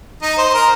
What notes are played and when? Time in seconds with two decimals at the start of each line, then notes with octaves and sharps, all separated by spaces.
0.21 D#4 D#5
0.37 C5 C6
0.49 C6
0.53 A#4 A#5